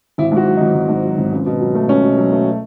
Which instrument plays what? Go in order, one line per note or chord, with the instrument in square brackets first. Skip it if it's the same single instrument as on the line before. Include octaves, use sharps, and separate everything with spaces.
[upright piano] G#1 E4
G#2 F#4
F#3
G#1 D#4
G#1
G#2
F#3
G#1
C#2
B2
F#3
A3
C#2 C#4
B2
F#3
A3